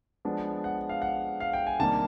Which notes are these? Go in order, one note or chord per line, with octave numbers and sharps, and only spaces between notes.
F3 G#3 B3 D4
F#5
F5
F#5
F5
G5
G#5
C3 D#3 G3 A#3 D4 A5